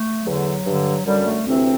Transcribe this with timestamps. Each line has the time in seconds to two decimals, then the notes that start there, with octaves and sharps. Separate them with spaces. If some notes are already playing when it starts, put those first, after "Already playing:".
Already playing: A3
0.23 E2 D3 F#3
0.64 G2 D3
1.05 F#2 D3 G3
1.25 A3
1.46 D2 C3 E3 C4